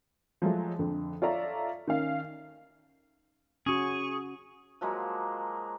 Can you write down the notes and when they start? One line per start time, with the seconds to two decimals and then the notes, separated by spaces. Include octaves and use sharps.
0.42 F3 F#3 G#3 A3
0.79 F2 D3
1.22 F4 A4 C#5 D5 E5 A#5
1.87 D#3 C#4 F5
3.66 C#4 F#4 G#4 C#6
4.81 F3 F#3 G#3 A#3